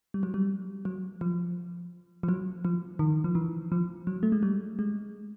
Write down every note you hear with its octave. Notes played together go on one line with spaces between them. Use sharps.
G3
F#3
G3
F#3
F3
F3
F#3
F3
D#3
F3
E3
F3
F#3
A3
G#3
G3
G#3